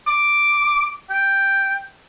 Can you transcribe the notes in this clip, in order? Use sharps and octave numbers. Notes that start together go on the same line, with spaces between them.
D6
G5